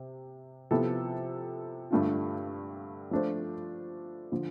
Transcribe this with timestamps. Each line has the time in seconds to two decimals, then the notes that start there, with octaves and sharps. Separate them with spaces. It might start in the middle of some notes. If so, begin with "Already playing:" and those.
Already playing: C3
0.71 C3 F3 B3 E4 A4
1.91 G2 D3 A3 D4 F4
3.11 F3 A3 D4 F4 C5
4.32 D3 F3